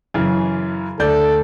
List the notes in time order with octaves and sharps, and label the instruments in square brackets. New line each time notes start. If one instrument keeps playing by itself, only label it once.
[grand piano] F#2 C#3 E3
[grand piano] D2 D5 G6 [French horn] A4